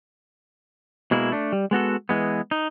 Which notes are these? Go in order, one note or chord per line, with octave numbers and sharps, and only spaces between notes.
B2 G#3 A#3 E4
A3 D4
G3
G#3 B3 F#4 A4
E3 G#3 B3
D#4